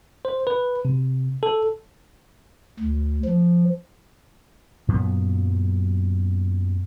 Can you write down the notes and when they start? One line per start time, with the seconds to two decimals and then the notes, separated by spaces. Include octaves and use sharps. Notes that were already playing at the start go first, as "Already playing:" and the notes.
0.25 C5
0.47 B4
0.85 C3
1.43 A4
2.79 D2
3.25 F3
4.88 F#2 A#2 F#3 B3